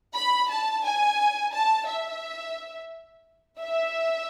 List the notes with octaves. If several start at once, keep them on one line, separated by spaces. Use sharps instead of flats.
B5
A5
G#5
A5
E5
E5